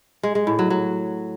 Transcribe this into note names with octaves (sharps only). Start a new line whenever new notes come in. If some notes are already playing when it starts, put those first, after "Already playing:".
G#3
G#3
A2
F#3
F#3